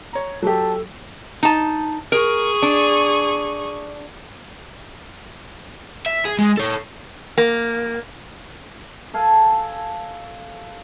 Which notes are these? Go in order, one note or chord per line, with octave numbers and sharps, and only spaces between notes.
C#5 A#5
F#3 G4 A4 A5
D#4 A5
G#4 A#4 C#6
D4
E5
G#4
G#3
A4 C#5
A#3
A4 F5 G#5 A5